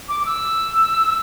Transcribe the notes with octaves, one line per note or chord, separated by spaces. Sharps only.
D6
D6
E6